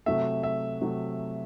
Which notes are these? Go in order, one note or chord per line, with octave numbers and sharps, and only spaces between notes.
C3 F#3 A3 E5
E5
C3 F#3 A3